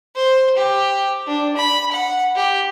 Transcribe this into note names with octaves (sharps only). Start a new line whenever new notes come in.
C5
G4
D4
B5
F#5
G4